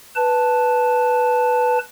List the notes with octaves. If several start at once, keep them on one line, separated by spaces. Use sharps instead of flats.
B4 A5